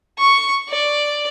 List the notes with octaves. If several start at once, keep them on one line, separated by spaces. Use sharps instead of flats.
C#6
D5